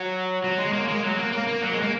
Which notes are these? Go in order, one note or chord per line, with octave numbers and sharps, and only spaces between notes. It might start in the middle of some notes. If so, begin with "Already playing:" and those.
Already playing: F#3
F#3
G#3
A#3
G#3
F#3
A#3
A#3
A#3
F#3
G#3
A#3